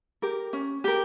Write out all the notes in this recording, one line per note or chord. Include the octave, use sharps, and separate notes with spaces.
G4 A#4
C#4
G4 A#4